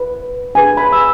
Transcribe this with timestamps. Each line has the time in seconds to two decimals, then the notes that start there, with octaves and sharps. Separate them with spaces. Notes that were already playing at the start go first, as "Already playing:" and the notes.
Already playing: B4
0.55 D4 G#4 B4 G#5
0.77 B5
0.93 E6